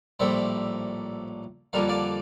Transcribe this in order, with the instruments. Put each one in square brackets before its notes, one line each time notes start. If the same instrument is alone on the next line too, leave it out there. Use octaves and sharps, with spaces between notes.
[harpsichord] A#1 A2 G3 A#3 C5 E5
F2 D3 G3 A#3 F5
D5 F5